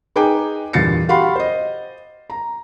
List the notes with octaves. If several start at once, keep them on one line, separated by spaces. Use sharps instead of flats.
D#4 G#4 B4 G5 G#5 D6
E2 G2 A#2 A6 C7 C#7
F#4 G4 F5 F#5 B5 C6
C5 D#5
A#5